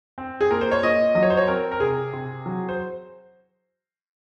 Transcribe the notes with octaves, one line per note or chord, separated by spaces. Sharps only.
C4
G#4
A#2 A#4
C5
C#5
A#2 D#5
F#3 D#5
C#5
C5
C#5
C4 A#4
A#4
C3 G#4
C3
F#3
C5